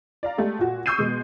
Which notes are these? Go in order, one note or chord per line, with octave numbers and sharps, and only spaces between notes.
D5 F5 A#5
G#3 A3 G4 G#4
A#2 F#4
C#6 D#6 E6 G6 C7 D#7
B2 G#3